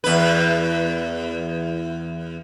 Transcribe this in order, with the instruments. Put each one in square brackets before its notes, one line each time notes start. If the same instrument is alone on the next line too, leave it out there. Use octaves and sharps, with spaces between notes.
[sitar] E2 B4